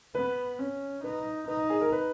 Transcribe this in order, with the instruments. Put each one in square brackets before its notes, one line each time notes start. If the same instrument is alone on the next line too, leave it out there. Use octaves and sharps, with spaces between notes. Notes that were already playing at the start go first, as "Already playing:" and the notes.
[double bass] B3 [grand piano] B4
[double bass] C#4
[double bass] D#4 [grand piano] B4
[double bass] D#4 [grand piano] B4
[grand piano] G#4
A#4
B4